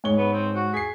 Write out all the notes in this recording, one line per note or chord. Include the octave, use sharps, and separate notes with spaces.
G#2 C#5 G7
B3
C4
F#4
G#4 B6 C7